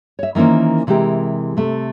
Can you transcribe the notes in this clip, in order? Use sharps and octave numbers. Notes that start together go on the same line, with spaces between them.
C#5 E5
D#3 E3 A#3 C#4 C5
C3 E3 G#3 G4 A#4
C3 A3